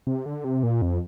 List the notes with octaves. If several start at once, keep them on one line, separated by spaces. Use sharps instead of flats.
C3
D3
C3
A#2
F2